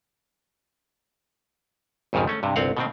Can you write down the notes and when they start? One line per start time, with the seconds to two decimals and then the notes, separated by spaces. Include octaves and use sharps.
2.13 G#1 F2 G#2 C#3 F3
2.27 A3 C#4
2.43 G2 C3
2.56 G1 C2 C4 F5 F#5
2.77 B2 D#3 C4